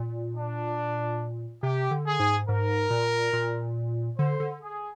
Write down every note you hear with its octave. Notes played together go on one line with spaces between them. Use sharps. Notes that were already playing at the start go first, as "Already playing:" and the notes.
Already playing: A#2
D4
C3 G4
D3
G#4
G#2
G#2 A#4
A#2
A#2
D3 C5
D3
G#4